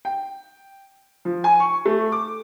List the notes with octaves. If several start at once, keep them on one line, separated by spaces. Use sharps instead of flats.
G5
F3
G#5
C#6
A3
D6